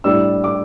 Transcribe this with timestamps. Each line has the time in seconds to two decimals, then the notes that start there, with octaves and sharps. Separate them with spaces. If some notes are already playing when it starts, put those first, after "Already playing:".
0.04 A2 G3 D4 E6
0.44 D6